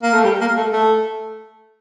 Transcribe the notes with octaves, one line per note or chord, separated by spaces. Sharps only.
A#3
A3
G3
A#3
A3
A3